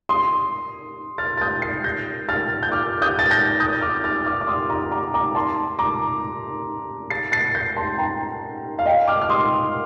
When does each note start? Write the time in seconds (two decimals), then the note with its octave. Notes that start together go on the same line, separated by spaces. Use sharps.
0.09 C6 D#6
1.18 F6 A6
1.37 A6
1.41 D#6 G6
1.62 A6 C7
1.84 G6 A#6
2.29 F6 A6
2.63 G6
2.72 D6 F6
3.02 D#6 G6
3.19 A6
3.31 G6 A#6
3.60 D#6 G6
3.81 D6 F6
4.04 F6 A6
4.26 D6 F6
4.41 D6
4.47 C6 D#6
4.70 A#5 D6
4.92 A#5 D6
5.14 A#5 D6
5.35 A5 C6
5.79 A#5 D6
7.10 A6 C7
7.32 A6 C7
7.55 G6 A#6
7.76 A5 C6
7.98 G5 A#5
8.79 F5
8.86 D#5 G5
9.08 D6 F6
9.21 F6
9.30 C6 D#6